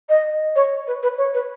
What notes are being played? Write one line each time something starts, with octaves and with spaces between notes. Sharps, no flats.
D#5
C#5
B4
B4
C#5
B4